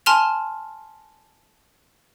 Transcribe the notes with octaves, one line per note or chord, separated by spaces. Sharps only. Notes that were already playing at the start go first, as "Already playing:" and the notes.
G#5 A5 C6 F6 E7 F7